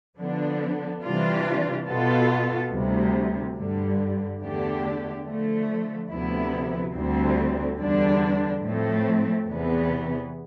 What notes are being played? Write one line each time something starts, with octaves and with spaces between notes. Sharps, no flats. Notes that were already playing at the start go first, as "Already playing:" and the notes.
D3 F3 B3 D4
C3 E3 G3 D4 F4
B2 B3 F4 A4
D2 C3 G3
G2 D3 G3
E2 D3 A3 D4 G4
D3 F3 A3
D2 C3 F3 B3 E4
D2 D3 G3 C4
E2 D3 G3 D4
A2 F3 A3 C4
E2 C3 E3 B3